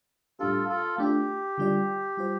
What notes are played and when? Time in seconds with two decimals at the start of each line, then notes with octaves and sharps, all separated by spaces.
0.39 A2 G3 D4 F4 G4 A4
0.69 F4 A4
0.98 A3 D4 F4 G4
1.58 D3 G3 F4 D5
2.17 G3 F4 C5